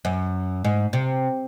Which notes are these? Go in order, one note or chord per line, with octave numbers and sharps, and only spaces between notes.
F#2
G#2
C3